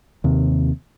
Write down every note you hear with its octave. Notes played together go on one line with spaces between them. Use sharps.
D#2 C3